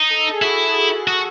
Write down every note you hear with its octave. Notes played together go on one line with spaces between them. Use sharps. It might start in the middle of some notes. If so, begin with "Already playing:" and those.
Already playing: D#4
A4
A4
G#4
E4 F#4
F#4